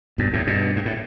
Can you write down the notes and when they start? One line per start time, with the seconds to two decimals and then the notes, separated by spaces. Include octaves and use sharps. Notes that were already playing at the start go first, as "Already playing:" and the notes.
0.18 G2 B2
0.33 E2 A2
0.47 G2 B2
0.76 G2
0.85 A2